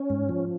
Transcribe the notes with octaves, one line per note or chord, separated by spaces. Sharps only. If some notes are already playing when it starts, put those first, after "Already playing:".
Already playing: C#4
G#2
F3